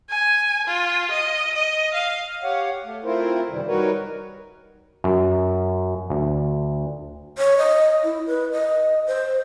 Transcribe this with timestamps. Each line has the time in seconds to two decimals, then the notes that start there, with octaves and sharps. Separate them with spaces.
0.10 G#5
0.68 F4
1.11 D#5
1.55 D#5
1.94 F5
2.43 G4 C#5 F5 F#5
2.84 A3
3.04 A3 C4 E4 F4 A#4 C5
3.50 F#2 C3 D#3 E3 G3
3.67 G3 D#4 F#4 A#4 B4 C#5
5.04 F#2
6.10 D2
7.38 C#5
7.58 D#5
8.04 E4
8.27 B4
8.52 D#5
9.07 C5